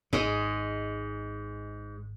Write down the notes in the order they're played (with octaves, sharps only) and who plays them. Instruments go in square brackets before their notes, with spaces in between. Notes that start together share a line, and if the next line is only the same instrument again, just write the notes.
[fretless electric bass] G#1 [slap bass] G#2 [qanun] G#3 D#5 C6